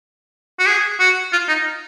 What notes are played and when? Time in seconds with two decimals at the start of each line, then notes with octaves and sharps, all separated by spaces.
0.60 F#4
0.67 G#4
1.00 F#4
1.32 F4
1.49 D#4